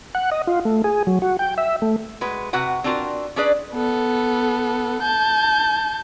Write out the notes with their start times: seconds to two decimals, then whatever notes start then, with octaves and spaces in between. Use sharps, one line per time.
0.15 F#5
0.31 D#5
0.47 F4
0.65 A3
0.84 G#4
1.07 F#3
1.22 F#4
1.39 G5
1.58 E5
1.82 A3
2.21 G#3 F#4 B4
2.53 C3 F#4 B4 F#5
2.84 C4 D4 F4 F#4 A#4
3.36 C#4 D4 G#4 B4 D5
3.73 B3 A4
5.03 A5 G6